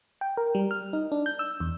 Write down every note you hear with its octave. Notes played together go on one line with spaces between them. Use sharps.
G5
A#4
G3
F6
D#4
D4
G6
E6
E2